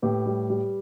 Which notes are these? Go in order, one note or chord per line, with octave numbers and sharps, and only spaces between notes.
A2 G4 B4
G3
G3